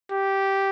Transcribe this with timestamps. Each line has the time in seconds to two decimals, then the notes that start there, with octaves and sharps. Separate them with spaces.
0.11 G4